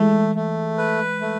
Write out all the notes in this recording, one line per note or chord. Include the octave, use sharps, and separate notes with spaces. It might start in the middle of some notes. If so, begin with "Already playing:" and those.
Already playing: E3 G#3 A3
A3
B4
A3